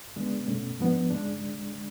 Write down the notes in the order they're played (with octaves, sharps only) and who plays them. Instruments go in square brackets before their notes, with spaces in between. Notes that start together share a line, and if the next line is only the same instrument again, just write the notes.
[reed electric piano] C#3 G#3 B3 D4
B2 A3 C#4
G#2 F3 B3 D4
C#3 G#3 D4